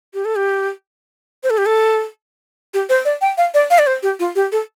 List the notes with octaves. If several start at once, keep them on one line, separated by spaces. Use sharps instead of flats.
G4
A4
G4
C5
A4
G4
A4
G4
C5
D5
G5
F5
D5
F5
D5
C5
G4
F4
G4
A4